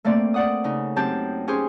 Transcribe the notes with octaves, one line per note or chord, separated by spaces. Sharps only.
A3 A#3 C4 D5
D5 F#5 D#6
C#3 D#4
F#2 C4 G4 A5 G6
C#4 G4 G#4 C5 C6